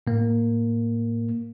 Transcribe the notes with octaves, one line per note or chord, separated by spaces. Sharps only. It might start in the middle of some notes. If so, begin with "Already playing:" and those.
A2 A#3